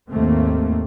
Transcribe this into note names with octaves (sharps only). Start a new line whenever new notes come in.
G#1 D#2 A3 A#3 C4